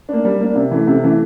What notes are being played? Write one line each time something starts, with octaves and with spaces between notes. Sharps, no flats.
A#3 D4
G3
A#3 D4
C3
E3 A3
C3
E3 A3